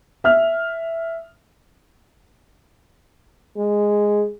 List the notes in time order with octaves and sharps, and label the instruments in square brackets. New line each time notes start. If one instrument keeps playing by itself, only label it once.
[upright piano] E5 F6
[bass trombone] G#3